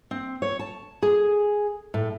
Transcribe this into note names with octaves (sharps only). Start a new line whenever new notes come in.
C4
C#5
A5
G#4
A2